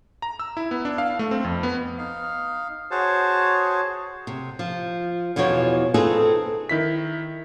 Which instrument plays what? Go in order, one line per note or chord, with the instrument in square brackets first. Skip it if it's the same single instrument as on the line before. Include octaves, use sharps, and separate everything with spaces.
[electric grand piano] A#5
E6
E4
B3
D4
F5
A3
C4
F2
B3
[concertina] D#4 F5
F#4 G#4 C5 C#5 A5
[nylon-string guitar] C3
F3
E2 B2 E3 F3 C#5
C4 D#4 F4 G#4 A4 B4
[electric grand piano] D#3 E4 B6